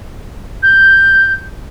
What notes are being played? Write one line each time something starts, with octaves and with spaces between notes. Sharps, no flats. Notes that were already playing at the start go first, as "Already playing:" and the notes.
G6